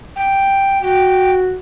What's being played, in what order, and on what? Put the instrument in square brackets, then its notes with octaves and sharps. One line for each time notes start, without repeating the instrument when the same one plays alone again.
[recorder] G5
[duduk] F#4 [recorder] G5